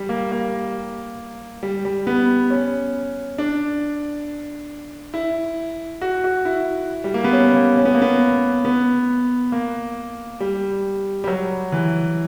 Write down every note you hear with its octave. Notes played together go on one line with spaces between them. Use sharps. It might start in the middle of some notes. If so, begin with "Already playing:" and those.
Already playing: G3
A#3
A#3
G3
G3
B3
C#4
D4
E4
F#4
F#4
E4
G3
A#3
B3
C#4
A#3
C#4
B3
A#3
B3
B3
A#3
G3
G3
F#3
E3